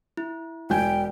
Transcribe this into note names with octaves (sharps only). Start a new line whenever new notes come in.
E4
E1 G5 G#5 G6